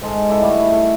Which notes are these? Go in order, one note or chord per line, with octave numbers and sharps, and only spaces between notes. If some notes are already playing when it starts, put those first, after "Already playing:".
G#2 G#3 A4
E4 A4 D5 D#5
G3 A3 C#5 F#5
A4